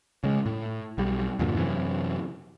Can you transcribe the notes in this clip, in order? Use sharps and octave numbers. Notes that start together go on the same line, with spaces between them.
C#3 G#3
A2
B1 G3
E2 G2 A#2 D3
F#2 C3 E3